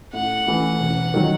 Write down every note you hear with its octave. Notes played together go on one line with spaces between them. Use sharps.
A2 F#5
E3 A3 E4
E1
D#3 F#3